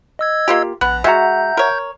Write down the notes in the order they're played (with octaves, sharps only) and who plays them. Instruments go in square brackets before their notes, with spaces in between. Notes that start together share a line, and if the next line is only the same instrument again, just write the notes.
[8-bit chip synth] D#5 E6 G#6
[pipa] A#3 F4 G4
[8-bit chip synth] A#1 [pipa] B3 [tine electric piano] F#6
[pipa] G#3 F#4 [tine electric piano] E5 F#5 A#5 [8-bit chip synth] G6
[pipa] A#4 C#5